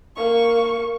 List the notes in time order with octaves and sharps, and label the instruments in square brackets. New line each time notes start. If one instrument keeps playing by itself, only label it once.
[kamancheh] A#3 C#6